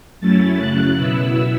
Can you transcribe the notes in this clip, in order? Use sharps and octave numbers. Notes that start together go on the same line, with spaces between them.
F#2 F#3 A3 C#4 E4 A6
F#2 C#3 F#3 F#6
B2 B3 E4 E6